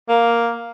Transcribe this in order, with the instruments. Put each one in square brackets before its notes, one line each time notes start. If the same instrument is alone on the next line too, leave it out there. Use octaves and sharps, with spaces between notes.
[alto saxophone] A#3